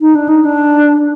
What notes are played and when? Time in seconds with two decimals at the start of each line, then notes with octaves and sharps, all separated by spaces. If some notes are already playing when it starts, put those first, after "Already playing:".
0.01 D#4
0.15 D4
0.29 D#4
0.45 D4